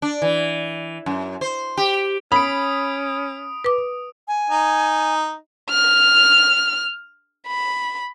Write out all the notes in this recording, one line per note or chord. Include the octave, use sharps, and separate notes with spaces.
D4
E3
F#2
C5
G4
C#4 B5 D#6 D7
B4 D6
G#5
D#4
F6
B5